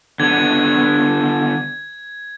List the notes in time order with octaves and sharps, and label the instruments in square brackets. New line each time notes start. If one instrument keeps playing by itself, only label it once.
[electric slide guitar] D3 B3 [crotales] G#6